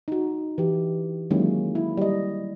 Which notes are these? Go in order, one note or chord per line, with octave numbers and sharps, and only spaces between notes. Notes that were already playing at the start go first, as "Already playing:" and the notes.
D#4 F#4
E3 G4
D#3 F#3 G#3 A#3 C#4 E4
E4
G3 D#5